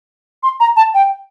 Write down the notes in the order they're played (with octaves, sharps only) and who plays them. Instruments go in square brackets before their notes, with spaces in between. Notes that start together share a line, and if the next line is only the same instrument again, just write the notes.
[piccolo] C6
A#5
A5
G5